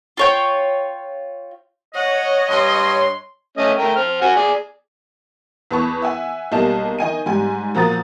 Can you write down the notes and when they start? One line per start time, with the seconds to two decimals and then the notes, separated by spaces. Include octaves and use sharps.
0.17 F4 C#5 G5
1.95 C#5 D#5 F#5
2.50 G2 C6
3.57 A3 C#4 D#5
3.77 A3 A#4 G5
3.96 C4 F6
4.21 F#4 F#5 G#5
4.36 G#4 D5
5.71 E2 B4 A5 C#6
6.02 E5 F#5 G#5
6.52 B1 G3 A#3 D#5 A5 E7
6.99 D#3 D#5 G#5 D#7
7.26 G#2 G3 G#5
7.75 A#2 F3 F#4 A#5 D#6 A6